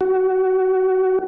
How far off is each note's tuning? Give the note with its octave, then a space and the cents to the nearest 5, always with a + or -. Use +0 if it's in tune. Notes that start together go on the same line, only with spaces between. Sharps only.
F#4 +25